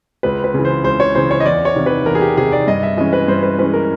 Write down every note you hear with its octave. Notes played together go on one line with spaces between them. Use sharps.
C#2 B4
B4
C#3 E3
C5
C#2 C5
C#5
C#3 E3 C5
C#5
D#5
E2 D5
C#5
C3 D#3
B4
E2 A#4
G#4
G4
C3 D#3 G#4
D5
G2 D#5
E5
E3 G#3 C#4 D#5
B4
G2 C5
B4
E3 G#3 C#4 B4
A#4